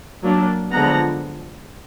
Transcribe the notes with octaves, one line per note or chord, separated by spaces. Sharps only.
F#3 A#3 D4
D3 F3 G#3 B3 F#5 A#5